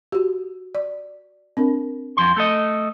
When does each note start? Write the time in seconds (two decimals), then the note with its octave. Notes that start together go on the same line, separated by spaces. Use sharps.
0.12 F#4 G4
0.75 D5
1.57 C4 D4 A#4
2.17 F2 F3 C6
2.36 A3 A4 D#5